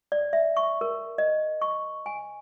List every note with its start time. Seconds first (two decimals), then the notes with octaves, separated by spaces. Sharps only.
0.12 D5
0.33 E5
0.57 C#6
0.81 A#4
1.18 D#5
1.62 C#6
2.06 G#5